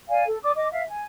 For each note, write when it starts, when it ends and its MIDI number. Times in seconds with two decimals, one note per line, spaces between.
0.10 0.24 74
0.10 0.24 77
0.10 0.24 80
0.26 0.38 69
0.43 0.52 74
0.43 0.52 86
0.43 0.52 87
0.57 0.68 75
0.57 0.68 86
0.72 0.83 76
0.72 0.83 77
0.89 1.05 80